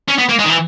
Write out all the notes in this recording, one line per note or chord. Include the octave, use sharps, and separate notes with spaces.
C#4
B3
A#3
G#3
D#3
E3